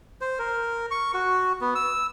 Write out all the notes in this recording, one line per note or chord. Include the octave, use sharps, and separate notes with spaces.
C5
A#4
C#6
F#4
B3
E6